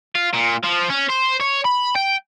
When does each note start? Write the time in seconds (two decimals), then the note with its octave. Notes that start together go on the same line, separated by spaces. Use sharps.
0.15 F4
0.34 A#2
0.64 F3
0.90 C#4
1.10 C5
1.41 C#5
1.65 B5
1.96 G5